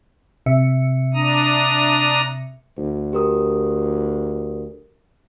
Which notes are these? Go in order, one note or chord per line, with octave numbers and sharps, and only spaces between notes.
C3 E5 C#7
D4 A#5 D#6
D2
G4 A#4 D#6